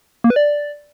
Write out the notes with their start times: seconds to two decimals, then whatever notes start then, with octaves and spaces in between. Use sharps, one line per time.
0.24 A#3
0.30 B4
0.36 D5